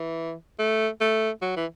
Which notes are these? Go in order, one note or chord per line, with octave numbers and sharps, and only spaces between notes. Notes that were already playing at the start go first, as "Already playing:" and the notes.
Already playing: E3
A3
A3
F#3
E3